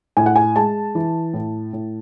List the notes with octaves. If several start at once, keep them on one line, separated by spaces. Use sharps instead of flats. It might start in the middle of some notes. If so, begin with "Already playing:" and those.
A2 G#5
F#5
G#5
G#3 A5
E3
A2
A2